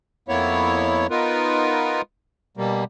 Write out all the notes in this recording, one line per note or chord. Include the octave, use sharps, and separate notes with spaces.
F2 A#3 B3 E4 C#5
B3 D#4 F4 A#4 B4
B2 G3 A#3